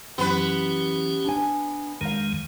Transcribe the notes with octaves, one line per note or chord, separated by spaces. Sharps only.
F#2 E3 B3 C#4 G4 B4
D4 G#5
F2 D#3 G#3 A#4 F5